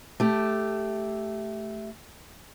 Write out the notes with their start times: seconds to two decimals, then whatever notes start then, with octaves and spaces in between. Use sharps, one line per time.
0.20 A3 G4